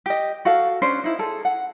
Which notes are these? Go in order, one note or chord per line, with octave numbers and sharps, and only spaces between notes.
G4 D#5
F#4 A4 F5
C#4 D4 C5
D#4 E4
G#4 A4
F#5